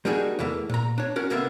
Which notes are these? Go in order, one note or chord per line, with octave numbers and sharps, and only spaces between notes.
G3 A#3 D4 D#4 F#4 G#4
E2 E3 A3 A#3
A#2 A#5
D4 C#5
C#4 F#4 A#4
C2 D3 A#3 B3 A#4 E5